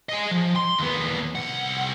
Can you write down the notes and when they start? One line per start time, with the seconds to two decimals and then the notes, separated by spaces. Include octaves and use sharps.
0.09 D#5 G#5
0.31 F3
0.56 C6
0.79 D#2 B3
1.35 C2 F#5